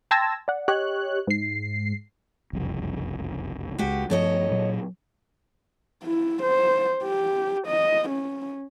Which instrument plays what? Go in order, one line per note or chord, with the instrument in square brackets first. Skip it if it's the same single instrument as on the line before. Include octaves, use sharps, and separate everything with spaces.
[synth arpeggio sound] G5 A5 C6 E6 G#6 A#6
D5 F#5
G4 C#5 D#5 F#6
G#2 C7
[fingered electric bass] F#1 C2 F2
[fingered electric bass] C#2 G#3 [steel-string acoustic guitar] F#4 G4
[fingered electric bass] G2 F3 A3 [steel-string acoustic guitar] A4 C#5 D#5
[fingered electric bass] A#2 F#3
[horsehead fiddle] E4
C5
G4
D#5
C#4